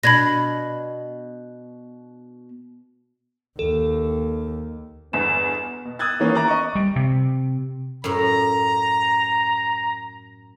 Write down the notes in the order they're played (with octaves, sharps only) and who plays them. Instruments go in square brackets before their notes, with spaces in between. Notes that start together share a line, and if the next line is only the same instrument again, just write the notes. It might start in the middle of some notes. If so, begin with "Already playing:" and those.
[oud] B2 D4 [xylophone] B5 G#6 A#6
[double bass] D#2 [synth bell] A4
[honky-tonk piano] G1 E2 [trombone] B3 [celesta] E7
[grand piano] B2
D#6 E6 F#6 G#6 A6
D#3 E3 A#3 B3 C#4
E5 A#5 D6 F#6 A6
D#5 C#6
[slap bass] G3
C3
[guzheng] F#2 A2 [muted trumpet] A#5